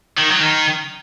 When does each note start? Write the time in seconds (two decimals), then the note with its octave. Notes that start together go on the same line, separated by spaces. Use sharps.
0.18 D#3
0.31 F#3
0.41 D#3